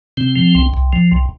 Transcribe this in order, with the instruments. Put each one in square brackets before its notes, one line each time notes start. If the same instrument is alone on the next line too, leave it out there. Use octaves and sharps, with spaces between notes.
[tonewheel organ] C3 C4
F3
C2
C2
F3
C2